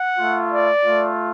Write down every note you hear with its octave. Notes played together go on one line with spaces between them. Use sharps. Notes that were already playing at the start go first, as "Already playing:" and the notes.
Already playing: F#5
A3 F4
D5
A3 F4